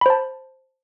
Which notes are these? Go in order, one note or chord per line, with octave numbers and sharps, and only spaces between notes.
C5 A5 B5